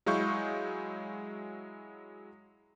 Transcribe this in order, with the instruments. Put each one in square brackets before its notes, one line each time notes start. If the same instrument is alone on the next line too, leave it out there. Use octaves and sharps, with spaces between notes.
[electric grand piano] F#3 G#3 E4 F5 C#6 G6